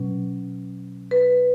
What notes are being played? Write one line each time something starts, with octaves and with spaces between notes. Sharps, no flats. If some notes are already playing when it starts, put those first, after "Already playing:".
Already playing: B2 F#3 C#4
B4